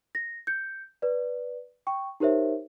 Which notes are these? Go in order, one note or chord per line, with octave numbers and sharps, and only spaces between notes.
A#6
G6 C#7
B4 D5
G5 C#6
D#4 G4 A#4 C5 C#5 E5